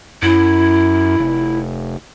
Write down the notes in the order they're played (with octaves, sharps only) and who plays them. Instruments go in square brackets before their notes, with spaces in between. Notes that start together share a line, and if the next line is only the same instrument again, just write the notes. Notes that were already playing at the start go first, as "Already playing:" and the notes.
[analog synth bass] F#2 [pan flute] E4
[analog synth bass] F1